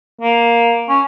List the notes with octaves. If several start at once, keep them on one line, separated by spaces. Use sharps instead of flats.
A#3
C#4